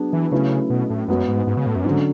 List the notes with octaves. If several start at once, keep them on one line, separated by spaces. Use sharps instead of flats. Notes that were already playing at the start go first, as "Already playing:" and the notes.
Already playing: F#3 B3 D4 G#4
E3
C#3 F#3 A3 C#4 E4 B4
B2
A2
F#2 G#3 B3 F#4
G#2
G#2
C#3
A2
F#2
G#2 D3 F#3 C#4